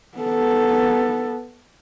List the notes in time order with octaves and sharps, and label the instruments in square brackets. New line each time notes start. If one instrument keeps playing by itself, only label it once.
[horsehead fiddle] B3 A4